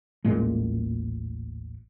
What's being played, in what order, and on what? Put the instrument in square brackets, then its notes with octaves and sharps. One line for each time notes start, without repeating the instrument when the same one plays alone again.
[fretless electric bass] D#1 A1 A#2 G#3